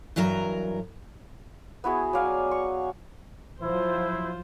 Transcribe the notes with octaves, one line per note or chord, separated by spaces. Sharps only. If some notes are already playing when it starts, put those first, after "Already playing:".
G2 E3 F#3 A#4 A#5
B3 E4 F#4 G#4
F#3 D5 F5 G#5
C#6
F3 F#3 E4 F4 C5